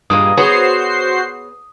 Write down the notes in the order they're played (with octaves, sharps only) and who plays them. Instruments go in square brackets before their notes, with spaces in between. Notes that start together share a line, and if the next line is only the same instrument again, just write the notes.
[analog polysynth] G2 [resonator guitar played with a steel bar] A#2 G#3 A#3 [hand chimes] D#6
[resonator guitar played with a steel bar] B3 G#4 C#5 [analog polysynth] F#4 C5 C7